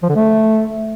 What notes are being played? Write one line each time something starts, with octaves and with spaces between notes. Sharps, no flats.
F3
D3
A3